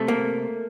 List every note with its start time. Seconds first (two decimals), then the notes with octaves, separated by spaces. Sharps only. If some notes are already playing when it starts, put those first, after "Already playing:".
Already playing: C3 A3 A4
0.08 A#3